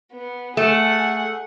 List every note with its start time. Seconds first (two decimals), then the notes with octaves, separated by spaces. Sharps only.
0.13 B3
0.57 A3 G#4 F#5